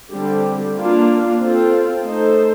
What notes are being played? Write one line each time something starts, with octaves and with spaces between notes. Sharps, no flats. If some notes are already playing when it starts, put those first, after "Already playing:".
D3 G3 C4 G4
A#3 D4 F4
C4 F4 A4
A3 D#4 A4 C5